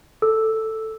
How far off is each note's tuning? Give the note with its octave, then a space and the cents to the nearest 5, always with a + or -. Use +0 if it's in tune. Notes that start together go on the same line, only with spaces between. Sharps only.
A4 +5 E6 +0